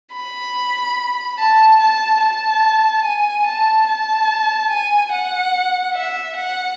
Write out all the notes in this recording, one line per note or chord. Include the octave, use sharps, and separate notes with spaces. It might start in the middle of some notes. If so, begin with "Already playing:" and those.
B5
A5
A5
A5
G#5
A5
A5
G#5
F#5
E5
F#5